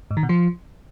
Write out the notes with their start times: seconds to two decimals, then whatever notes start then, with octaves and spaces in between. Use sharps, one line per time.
0.11 G#2
0.17 D#3
0.23 B2
0.29 F3